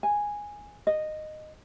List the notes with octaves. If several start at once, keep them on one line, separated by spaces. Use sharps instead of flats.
G#5
D#5